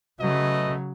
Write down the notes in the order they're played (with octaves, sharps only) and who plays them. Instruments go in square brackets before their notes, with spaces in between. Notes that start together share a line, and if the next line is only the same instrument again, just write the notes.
[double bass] C#3 F#3 [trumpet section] A3 B4 D#5